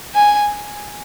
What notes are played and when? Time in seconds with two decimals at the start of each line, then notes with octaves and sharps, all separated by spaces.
0.15 G#5